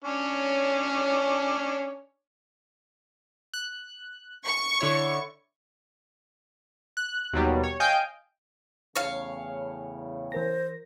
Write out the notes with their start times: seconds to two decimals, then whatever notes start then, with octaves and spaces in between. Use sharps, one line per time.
0.04 C#4 D4 C#5
3.54 F#6
4.46 C#6
4.81 D3 E4 C#5
6.97 F#6
7.33 D#2 B2 F#3 G3
7.63 C#5
7.80 D#5 F5 G5 G#5 G6 D7
8.95 E2 A2 C#3 C#5 F5
10.32 E3 A#4 C5 A#6